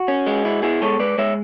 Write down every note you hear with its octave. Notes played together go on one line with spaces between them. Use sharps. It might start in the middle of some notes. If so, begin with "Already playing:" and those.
Already playing: F#4
C#4
G#3
E4
B2 E4 G#4
G#3 A4 C#5
G#3 B4 D5
G#3 C#5 E5